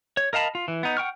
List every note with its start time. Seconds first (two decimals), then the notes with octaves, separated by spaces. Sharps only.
0.17 C#5
0.33 A#4 D#5 F5 A5 B5
0.55 F4
0.68 E3
0.83 B3 D#4
0.97 F#5 G5 C#6 F6